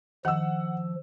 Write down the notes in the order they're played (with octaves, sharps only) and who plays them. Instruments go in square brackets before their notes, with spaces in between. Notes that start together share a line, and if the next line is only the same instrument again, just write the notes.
[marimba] D#3 [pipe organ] F3 [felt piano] F#5 E6